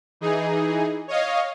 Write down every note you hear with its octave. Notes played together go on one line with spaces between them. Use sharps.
E3 D#4 G#4
C#5 D#5 F5